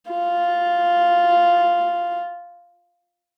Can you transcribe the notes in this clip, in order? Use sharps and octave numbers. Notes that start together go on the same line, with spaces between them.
F4